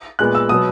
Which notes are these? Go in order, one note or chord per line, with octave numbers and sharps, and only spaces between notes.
A#2 G#3 B3 F#6
E6
B2 F#3 B3 D#6